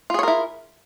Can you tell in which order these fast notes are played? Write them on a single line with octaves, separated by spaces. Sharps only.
F4 G#4 C#5 A#4 E4